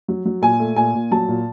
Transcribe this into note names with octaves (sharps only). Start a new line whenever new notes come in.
F#3
F#3
A#2 G#5
A3
A#2 G#5
A#2
F#3 A5
A#2